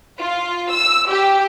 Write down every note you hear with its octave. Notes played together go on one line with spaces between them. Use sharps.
F4
E6
G4